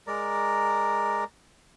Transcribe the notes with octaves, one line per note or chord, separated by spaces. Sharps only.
G#3 A#4 D5 A#5